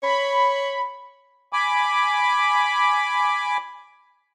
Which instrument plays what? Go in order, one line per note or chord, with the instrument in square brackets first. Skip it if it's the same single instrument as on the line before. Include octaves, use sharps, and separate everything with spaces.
[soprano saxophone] C#5 [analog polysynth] B5
[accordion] G#5 B5 D6